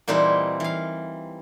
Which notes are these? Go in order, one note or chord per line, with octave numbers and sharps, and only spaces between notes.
A#2 E3 G3 C4 D#4 E4
E3 F5